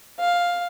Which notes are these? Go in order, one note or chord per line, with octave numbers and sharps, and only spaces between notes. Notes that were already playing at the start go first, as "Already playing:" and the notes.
F5